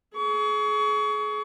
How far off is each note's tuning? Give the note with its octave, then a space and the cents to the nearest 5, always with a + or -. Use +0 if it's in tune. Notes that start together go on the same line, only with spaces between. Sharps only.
G#4 +35 C#6 +30